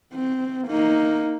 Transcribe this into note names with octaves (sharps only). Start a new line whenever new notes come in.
C4
A#3 D#4